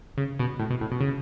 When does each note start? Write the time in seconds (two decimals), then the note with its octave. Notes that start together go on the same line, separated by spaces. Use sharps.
0.18 C#3
0.39 B2
0.59 A2
0.70 B2
0.81 A2
0.91 B2
1.00 C#3